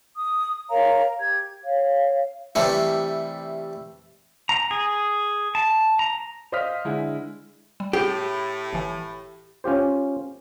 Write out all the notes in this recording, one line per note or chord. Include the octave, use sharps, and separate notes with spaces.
D#6
A#4 C#5 F5 A#5
G4 G#6
C#5 F5
C3 E3 G3 A3
A#5
G#4
A5
A#5
C5 D#5 F5 D#6 F6 B6
D3 G#3 E4
G3
A2 G4 G#4
G1 E3
C#4 F4 G4 C5